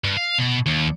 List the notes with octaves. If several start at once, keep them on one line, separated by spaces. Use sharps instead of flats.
G2
F5
B2
D#2